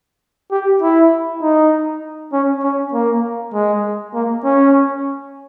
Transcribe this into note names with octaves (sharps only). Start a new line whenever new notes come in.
G4
E4
D#4
C#4
C#4
A#3
G#3
A#3
C#4